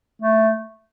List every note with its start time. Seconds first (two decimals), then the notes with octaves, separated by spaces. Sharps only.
0.22 A3